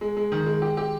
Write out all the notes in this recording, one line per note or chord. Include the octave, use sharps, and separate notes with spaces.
G#3
G#3
D#3
G#3
G4
G4